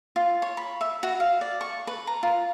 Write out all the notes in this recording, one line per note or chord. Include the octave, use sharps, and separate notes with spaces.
F4
C#5
B5
E5
F#4
F5
D5
C#6
B4
A#5
F4